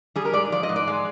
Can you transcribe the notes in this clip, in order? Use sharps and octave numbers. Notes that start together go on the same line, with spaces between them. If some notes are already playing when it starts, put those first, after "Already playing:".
G3 G#4
A#4
G#2 D5
F3 D5
D#5
G#2
D5
G#3